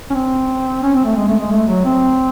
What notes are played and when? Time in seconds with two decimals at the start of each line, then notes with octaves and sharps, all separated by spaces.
0.10 C#4
0.14 C4
0.83 C#4
0.94 C4
1.05 A3
1.16 G#3
1.28 A3
1.39 G#3
1.51 A3
1.68 F#3
1.85 C4